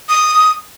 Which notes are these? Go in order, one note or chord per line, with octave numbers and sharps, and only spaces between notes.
D#6